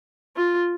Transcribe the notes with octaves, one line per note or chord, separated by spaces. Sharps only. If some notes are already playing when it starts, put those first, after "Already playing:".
F4